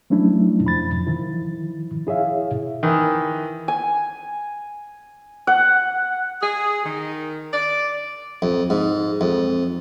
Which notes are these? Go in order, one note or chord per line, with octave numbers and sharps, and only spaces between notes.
F3 F#3 A3 C#4 D4 E4
F2 F3 B5 A6
D#3 F3 E4
E4 G#4 C#5 E5 F5
D#3 E3
G#5
F#5
G#4
D#3
D5
F2
G#2
F2